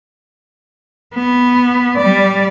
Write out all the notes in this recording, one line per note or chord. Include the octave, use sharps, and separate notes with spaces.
B3
G3 D5